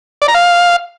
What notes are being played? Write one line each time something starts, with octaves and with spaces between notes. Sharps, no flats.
D5
A#5
F5